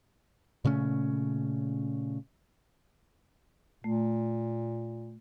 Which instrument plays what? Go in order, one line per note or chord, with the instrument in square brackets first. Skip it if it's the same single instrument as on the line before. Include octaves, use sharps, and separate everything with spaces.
[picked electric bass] A#2 C#3 A3 C#4
[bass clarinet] A#2 [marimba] A3